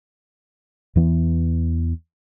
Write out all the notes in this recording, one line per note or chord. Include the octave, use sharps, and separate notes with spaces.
E2 E3 B3